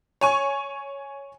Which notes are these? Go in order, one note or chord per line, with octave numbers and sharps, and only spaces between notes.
C#5 G#5 C#6